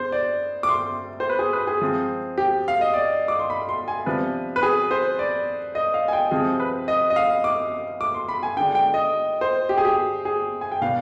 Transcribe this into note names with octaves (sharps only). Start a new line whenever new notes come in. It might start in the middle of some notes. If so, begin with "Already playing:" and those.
Already playing: D3 G#3 B3 C5
D5
D6
C6
C5
B4
G#4
B4
G#4
F3 G#3 C4
G4
F5
D#5
D5
D6
C6
B5
C6
G#5
C3 F3 B3 D4 B4
B4
G#4
C5
D5
D#5
F5
G#5
G5
C3 F3 C4 G#4
B4
D#5
D#5
F5
D6
D6
C6
B5
G#5
D3 G#3 D4 G5
G5
D#5
C5
G4
G#4
G4
G#4
G#5
G5
B2 B3 D4 F5